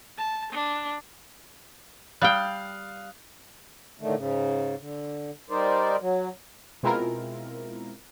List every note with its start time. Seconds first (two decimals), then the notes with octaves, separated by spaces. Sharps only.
0.18 A5
0.53 D4
2.22 G3 F5 G5 D#6 F#6
4.00 A2 D3 D#3 A3
4.16 G#2 C#3
4.79 D3
5.50 G3 D#4 A#4 C5 D5
6.01 F#3
6.83 B2 G#3 C4 E4 F4 A#4